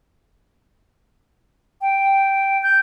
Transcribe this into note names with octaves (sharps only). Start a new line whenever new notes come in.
G5
G6